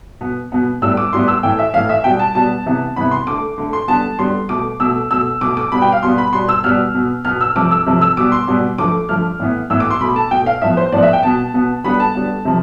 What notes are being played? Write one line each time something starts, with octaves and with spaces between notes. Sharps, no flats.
B2 B3
B2 B3
A2 G3 B3 E6
D6
A2 G3 B3 C6
E6
A2 E3 A3 G5
E5
A2 E3 A3 F5
E5
B2 G3 B3 G5
A5
B2 G3 B3 A5
C3 E3 B3
C3 E3 B3 B5
C6
D3 A3 D6
D3 A3
C6
D3 G3 B3 A5
D3 G3 B3 C6
B2 A3 D6
B2 A3 E6
B2 A3 E6
B2 A3 D6
D6
B2 G3 B3 B5
G5
F5
B2 G3 B3 C6
B5
B2 G3 B3 C6
E6
B2 G3 B3 F6
B2 B3
B2 B3 F6
E6
C3 F3 A3 D6
E6
C3 F3 A3
E6
B2 G3 B3 D6
C6
B2 G3 B3
D3 F3 A3 D6
D3 F3 A3 F6
A2 E3 B3
A2 E3 B3 E6
D6
C6
B2 A3 B5
A5
B2 A3 G5
F5
A2 F3 B3 E5
C5
A2 F3 B3 D5
E5
G5
B2 B3 A5
B2 B3
D3 G3 B3 B5
A5
D3 G3 B3
C3 F3